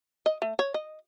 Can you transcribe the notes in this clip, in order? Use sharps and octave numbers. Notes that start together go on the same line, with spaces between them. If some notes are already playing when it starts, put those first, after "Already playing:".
D#5
A3
C#5
D#5